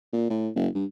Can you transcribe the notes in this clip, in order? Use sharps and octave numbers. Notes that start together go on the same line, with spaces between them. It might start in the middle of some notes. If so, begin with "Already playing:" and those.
A#2
A2
F#1
G2